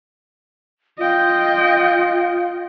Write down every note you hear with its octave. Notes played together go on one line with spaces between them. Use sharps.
F4 D#5 G5